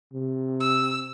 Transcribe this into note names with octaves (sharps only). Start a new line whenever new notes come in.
C3
E6